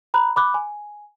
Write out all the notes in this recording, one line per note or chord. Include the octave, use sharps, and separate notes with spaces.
A#5 B5 F#6
B5 D6 F#6
G#5